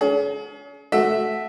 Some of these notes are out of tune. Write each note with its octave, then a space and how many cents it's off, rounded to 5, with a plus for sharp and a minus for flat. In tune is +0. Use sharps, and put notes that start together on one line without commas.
C#4 +40 G#4 +35
A3 -15 F#4 +0 E5 +0